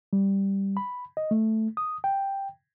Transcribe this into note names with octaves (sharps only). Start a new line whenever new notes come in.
G3
B5
D#5
A3
D#6
G5